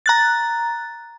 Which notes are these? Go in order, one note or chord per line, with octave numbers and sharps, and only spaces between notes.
A#5 F#6 A6